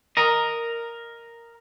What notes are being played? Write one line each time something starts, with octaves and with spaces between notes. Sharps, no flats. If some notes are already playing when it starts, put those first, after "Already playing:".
A#4 D#5